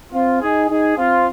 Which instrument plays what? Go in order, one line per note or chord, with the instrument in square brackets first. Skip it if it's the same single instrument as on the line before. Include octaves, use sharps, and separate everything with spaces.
[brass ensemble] C4 F4
D#4 G#4
D#4 G#4
C4 F4